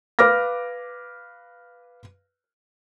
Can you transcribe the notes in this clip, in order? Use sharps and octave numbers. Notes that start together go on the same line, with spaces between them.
B4 F5 D6 F6 A#6